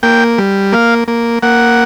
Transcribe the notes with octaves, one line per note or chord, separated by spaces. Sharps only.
A#3 G5
G3
A#3 F5
A#3
A#3 F#5